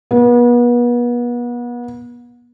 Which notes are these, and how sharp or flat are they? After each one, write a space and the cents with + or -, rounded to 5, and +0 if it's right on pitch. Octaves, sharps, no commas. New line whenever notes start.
B3 -35